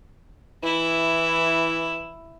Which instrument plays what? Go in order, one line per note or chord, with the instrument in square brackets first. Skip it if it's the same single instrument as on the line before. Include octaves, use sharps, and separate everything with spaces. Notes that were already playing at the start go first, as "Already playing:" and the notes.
[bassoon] E3 [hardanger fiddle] E4